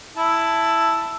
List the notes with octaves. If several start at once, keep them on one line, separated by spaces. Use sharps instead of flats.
E4 A5